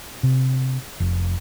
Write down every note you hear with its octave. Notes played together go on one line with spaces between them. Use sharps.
C3
F1